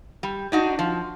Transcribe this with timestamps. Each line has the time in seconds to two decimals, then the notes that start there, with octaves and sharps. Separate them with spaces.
0.23 G3
0.52 D4 D#4 F#4
0.79 F3